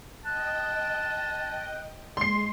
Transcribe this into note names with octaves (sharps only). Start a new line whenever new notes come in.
D#5 G5 A5 F#6
G#3 C6 C7